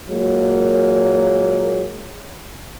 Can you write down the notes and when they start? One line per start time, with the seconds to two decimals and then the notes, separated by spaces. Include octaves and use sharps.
0.10 A#2 F#3 G#3 A#3